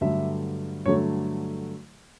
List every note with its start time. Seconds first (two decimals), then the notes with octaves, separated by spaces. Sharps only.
0.01 G2 D3 F#3 A3 E5
0.86 G2 D3 F#3 A3 C#5